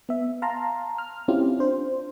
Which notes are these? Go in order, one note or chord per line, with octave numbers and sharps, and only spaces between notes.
B3 E5
F5 A5 A#5 C6
F6
C4 C#4 E4 F4 G4
D4 C5